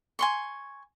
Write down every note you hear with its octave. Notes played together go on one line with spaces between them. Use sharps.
G#5 C6 C#6